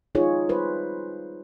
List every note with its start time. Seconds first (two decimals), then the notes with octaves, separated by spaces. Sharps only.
0.15 D#4 F4 G#4 C#5
0.49 G3 B4 C5